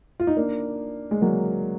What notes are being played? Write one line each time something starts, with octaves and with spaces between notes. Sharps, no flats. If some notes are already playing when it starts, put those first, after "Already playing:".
F4
D#4
A#3 D4
G#3
F#3 A#3